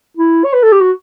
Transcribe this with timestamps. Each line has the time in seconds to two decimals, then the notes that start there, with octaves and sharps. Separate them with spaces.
0.17 E4
0.44 C#5
0.53 B4
0.63 A4
0.72 G4
0.81 F#4